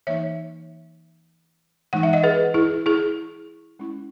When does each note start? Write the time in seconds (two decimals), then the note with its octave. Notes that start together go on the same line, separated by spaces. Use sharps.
0.07 E3 A#3 D#4 C#5 E5
1.93 E3 G#3 D#4 F#5
2.03 E5
2.13 D#5 F#5
2.23 G#4 B4
2.54 E4 G#4
2.86 E4 G#4
3.79 G#3 C#4 E4